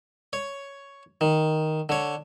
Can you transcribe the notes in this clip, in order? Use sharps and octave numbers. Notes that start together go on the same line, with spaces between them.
C#5
D#3
D3 C#5